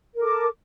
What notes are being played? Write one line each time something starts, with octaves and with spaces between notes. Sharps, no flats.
A4 A#4 D6